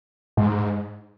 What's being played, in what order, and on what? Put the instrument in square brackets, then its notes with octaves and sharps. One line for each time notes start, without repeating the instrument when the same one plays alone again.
[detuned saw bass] G#2